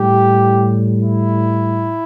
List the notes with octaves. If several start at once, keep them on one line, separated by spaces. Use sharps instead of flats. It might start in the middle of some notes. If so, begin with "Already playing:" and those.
Already playing: A2 G3 G4
E4